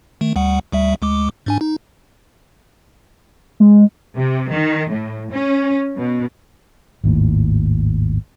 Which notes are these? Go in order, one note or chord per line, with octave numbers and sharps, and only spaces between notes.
D#3 A3
D2 G3 F#5
D2 G3 E5
D2 G#3 D6
G#2 D4 G#5
D#4
G#3
C3
D#3
A2
C#4
B2
G#1 D#2 A2